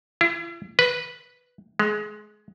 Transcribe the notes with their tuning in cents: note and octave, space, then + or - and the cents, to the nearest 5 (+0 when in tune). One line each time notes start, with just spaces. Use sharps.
E4 +45
B4 -5
G#3 +20